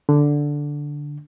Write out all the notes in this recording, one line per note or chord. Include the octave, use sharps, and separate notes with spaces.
D3